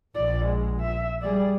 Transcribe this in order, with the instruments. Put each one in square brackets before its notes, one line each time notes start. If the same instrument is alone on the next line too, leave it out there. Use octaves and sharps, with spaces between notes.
[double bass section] A#1 [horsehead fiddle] D5
[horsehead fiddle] G#3
E5
[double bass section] G3 [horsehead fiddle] G#4 D5